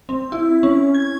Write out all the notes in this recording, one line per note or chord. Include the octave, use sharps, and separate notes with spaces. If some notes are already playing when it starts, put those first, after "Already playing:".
C4
E4
C#4
G#6